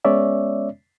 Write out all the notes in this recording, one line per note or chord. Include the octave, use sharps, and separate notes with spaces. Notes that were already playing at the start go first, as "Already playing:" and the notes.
G#3 B3 C#4 C#5 D5 E5